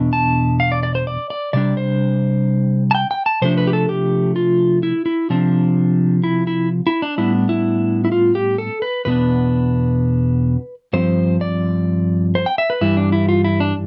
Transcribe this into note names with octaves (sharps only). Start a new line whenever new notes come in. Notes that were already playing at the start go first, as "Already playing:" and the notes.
Already playing: E2 B2 D4
A5
F5
D5
D5
C5
D5
D5
C3 G3 D4 D5
C5
A5
G5
G5
A5
C3 F3 A3 D4 C5
B4
G4
A4
G4
F4
E4
E4
C3 F3 C4 D4
E4
E4
E4
D4
A2 G3 B3 D4 E4
E4
E4
F4
G4
A4
B4
E2 B2 B3 D4 B4
G2 F3 C4 C5
D5
C5
G5
E5
B4
G2 E3 G3 E4
D4
E4
F4
E4
D4